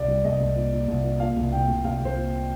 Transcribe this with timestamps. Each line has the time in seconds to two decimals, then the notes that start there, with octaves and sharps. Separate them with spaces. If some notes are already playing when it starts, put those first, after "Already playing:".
Already playing: C2 D5
0.08 G3
0.24 C2 D#5
0.40 C2
0.56 A#2
0.72 A#2
0.88 C2
1.04 A#2
1.20 A#2 F5
1.36 C2
1.52 C2 G5
1.68 C2
1.84 C2 F5
2.00 C2
2.05 C5
2.16 A#2